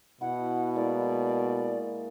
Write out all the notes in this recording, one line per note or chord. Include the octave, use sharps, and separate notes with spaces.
B2 E4 F#5
G#3 A#3 E4 D5